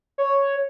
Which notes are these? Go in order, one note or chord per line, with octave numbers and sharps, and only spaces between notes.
C#5